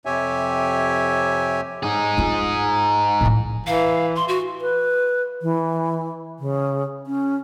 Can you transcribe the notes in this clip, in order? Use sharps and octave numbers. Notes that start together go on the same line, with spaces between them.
F2 C3 G4 C#5 E5 G#5
D#4 G#4
G#3 F4
A2 A#3
E3 F5
C6
F#4
B4
E3
C#3
C#4